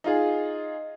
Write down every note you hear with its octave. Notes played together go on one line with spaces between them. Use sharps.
D#4 F4 G#4